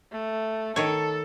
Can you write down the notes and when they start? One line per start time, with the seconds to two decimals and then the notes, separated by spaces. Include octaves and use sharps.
0.12 A3
0.76 D#3 A4 C#5